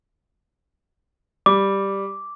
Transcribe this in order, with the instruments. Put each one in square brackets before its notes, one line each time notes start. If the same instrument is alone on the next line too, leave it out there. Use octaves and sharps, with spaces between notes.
[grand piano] G3 [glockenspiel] D6